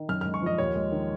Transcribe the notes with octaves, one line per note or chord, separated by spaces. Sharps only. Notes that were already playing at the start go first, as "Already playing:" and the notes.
Already playing: D#3
F#2 F6
G#3 F6
C#6
F3 D#5
D#2 C#5
G#3
D#3